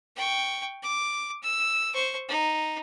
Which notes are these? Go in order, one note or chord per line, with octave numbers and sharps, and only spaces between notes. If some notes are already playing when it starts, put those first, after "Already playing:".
G5 C#6
D6
E6
C5 C#6
D#4